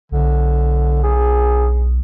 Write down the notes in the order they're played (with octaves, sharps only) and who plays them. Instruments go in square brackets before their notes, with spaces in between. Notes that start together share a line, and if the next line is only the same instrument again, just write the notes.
[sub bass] B1 [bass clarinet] D3
[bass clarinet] G#4